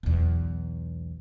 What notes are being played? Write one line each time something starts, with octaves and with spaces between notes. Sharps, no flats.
B1 E2